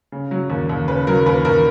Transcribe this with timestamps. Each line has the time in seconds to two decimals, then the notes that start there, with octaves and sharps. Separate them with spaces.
0.12 C#3
0.31 F#3
0.50 D#2
0.69 D#2
0.88 C#3 B4
1.07 F#3 A#4
1.26 D#2 B4
1.45 D#2 A#4